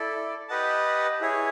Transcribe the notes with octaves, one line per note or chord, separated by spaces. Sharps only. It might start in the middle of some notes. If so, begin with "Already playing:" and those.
Already playing: E4 A4 D5
G4 B4 D#5 F#5 A5
E4 G#4 C#5